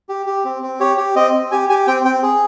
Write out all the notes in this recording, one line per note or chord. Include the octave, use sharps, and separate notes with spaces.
G4
G4
C4
C4
G4 C#5
G4
C4 D#5
C4
G4 G#5
G4 G#5
C4 G5
C4 G5
G#4